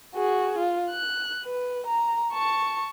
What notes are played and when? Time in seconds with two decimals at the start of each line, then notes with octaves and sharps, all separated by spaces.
0.15 F#4 G#4
0.58 F4
0.90 F#6
1.44 B4
1.87 A#5
2.33 A5 C#6